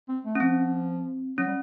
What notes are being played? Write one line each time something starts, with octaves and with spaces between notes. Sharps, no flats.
C4
A3
C#4
F3 C4
F#3 C#4
G3